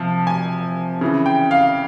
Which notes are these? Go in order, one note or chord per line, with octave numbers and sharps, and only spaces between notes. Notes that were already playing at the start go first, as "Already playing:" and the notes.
Already playing: C3 F3 A5
G#5
C#3 E3
G5
F5